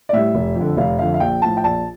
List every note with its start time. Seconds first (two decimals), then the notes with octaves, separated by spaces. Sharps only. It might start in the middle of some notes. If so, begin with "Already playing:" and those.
0.09 D5
0.13 A2 G3 E5
0.35 F1
0.56 F2
0.61 D3
0.77 F1 F5
0.99 F2 D3 F5
1.14 F5
1.20 A#1 G5
1.42 A2 F3 A5
1.57 G5
1.64 A#1 A5